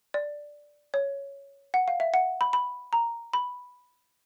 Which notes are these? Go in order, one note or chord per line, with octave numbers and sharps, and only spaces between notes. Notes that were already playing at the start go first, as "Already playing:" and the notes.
D5
C#5
F#5
F5
E5
F#5
B5
B5
A#5
B5